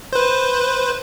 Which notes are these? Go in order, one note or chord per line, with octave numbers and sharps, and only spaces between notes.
B4 C5